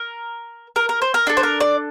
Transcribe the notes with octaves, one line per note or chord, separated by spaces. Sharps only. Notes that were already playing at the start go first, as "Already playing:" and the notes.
Already playing: A#4
A#4
A#4
C5
A#4
D4 A4
C5
A#4
D5